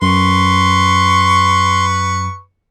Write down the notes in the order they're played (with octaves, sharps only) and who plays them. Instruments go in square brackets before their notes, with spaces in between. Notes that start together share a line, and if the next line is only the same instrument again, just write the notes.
[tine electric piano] F#2 [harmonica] B4 C#6 [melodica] C6